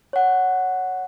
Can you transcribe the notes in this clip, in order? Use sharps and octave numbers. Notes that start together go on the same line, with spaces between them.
C#5 F#5